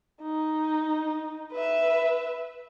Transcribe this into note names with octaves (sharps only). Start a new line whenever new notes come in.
D#4
B4 E5